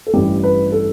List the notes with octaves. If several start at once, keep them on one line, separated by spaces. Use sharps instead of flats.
A4
A1 G2 E3 G4
B4
A4